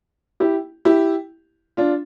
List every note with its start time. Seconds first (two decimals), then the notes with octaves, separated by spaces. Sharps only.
0.40 E4 G4
0.85 E4 G4
1.77 D4 F4